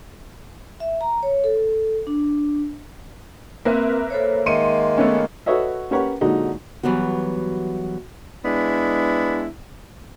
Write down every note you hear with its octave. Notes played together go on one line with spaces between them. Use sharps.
E5
A#5
C#5
A4
D4
A#3 C4 A#4 B4 E5
A4 C5 C#5
D#3 G#3 A#3 E5 C6 C#7 D#7
A3 B3 C#4 C#6
F#4 A4 B4 C#5 D#5 E5
C#4 G4 A#4 B4 C#5 F#5
A#2 D3 F#3 G#3 D#4 F#4
E3 F#3 G3 B3 F#4
G#3 B3 D4 E4